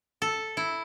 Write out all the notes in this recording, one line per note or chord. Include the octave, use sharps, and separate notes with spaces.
A4
E4